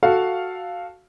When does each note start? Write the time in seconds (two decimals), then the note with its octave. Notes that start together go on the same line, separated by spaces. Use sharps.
0.03 F#4 A4 F5